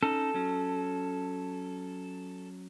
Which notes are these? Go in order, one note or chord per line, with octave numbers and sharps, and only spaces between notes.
C#4 D#4 A4
F#3 C#4